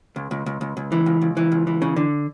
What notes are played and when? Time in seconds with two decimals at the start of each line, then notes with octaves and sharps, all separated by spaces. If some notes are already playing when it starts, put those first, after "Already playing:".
0.16 C#2
0.31 C#2
0.46 C#2
0.61 C#2
0.77 C#2
0.92 E3
1.06 C#2
1.21 C#2
1.37 E3
1.52 C#2
1.67 E3
1.82 C#3
1.96 D3